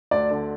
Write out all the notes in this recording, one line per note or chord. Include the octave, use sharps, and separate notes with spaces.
D2 D5
D3